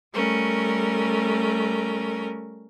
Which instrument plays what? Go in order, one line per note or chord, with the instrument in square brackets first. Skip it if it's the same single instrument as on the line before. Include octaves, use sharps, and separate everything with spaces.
[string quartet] G3 A3 C#4 A#4